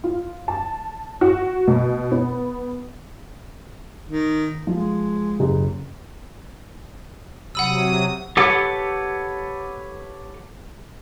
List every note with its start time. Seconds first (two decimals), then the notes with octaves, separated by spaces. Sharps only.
0.04 F4
0.48 A5
1.21 F#4
1.68 B2
2.11 B3
4.05 D#3
4.67 F3 G#3
5.40 F#1
7.55 C3 F#3 F#5 B5 D#6 E6
8.37 G4 A4 B4 C#5 F#5